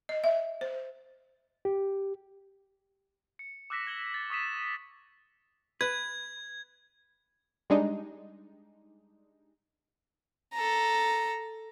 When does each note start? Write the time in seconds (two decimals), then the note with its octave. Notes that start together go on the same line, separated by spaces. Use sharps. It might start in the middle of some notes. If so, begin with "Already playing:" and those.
0.09 D#5
0.24 E5
0.61 C5
1.65 G4
3.39 C#7
3.70 D6 E6 F#6 A#6 B6 E7
3.87 G#6 F#7 G7
4.14 A6
4.30 C#6 D#6 B6 E7
5.81 B4 G#6
7.70 G3 G#3 D4 D#4
10.54 A4 A#5